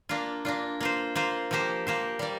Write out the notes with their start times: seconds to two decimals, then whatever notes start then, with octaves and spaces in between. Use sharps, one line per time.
0.09 A#3 D4 F4
0.45 A#3 D4 F4
0.80 A#3 F4 C5
1.15 A#3 F4 C5
1.51 F3 A#3 G4 C5
1.87 F3 A#3 G4 C5
2.19 G3 A#3 D5